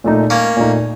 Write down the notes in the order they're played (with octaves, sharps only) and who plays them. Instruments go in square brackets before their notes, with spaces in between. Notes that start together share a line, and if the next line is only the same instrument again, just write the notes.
[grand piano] A#2 A3 D#4
[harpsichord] A#3 C#4
[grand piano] A#2 A3 D#4